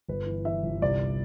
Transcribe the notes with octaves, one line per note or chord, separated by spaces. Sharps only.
G1 B4
E3
E3 E5
G1
C2 D5